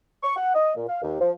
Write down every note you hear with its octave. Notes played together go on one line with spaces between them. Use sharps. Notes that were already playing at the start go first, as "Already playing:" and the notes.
C#6
F#5
D#5
A#2
F5
D#2
F3